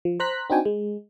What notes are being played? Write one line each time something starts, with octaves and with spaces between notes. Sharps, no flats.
F3
C5 A#5 F#6 B6
C4 D4 D#4 F#4 G5 G#5
G#3